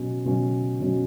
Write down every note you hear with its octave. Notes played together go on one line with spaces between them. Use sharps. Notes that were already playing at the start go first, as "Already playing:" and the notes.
Already playing: B2 F#3 C#4
B2 F#3 C#4
B2 F#3 C#4